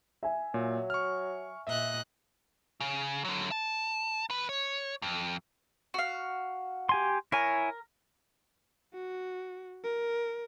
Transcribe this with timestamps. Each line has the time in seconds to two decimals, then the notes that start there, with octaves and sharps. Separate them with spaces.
0.23 E5 G#5
0.54 A#2 F#3
0.90 C#6 F6
1.67 A#2 D#5 E5 F#6
2.80 C#3
3.25 D3 F#3
3.51 A5
4.30 D#2 B4
4.49 C#5
5.02 F2
5.94 F#4 F5
6.89 G4 G#5 C6
7.32 E4 A#4 C#5 G#5
8.94 F#4
9.84 A#4